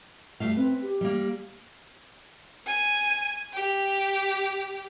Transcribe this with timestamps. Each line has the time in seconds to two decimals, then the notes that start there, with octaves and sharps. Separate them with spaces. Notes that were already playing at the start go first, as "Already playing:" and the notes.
0.40 G3 A3 F5
0.57 C4 B4
0.82 G4
1.01 G3 A#3
2.67 G#5
3.54 G4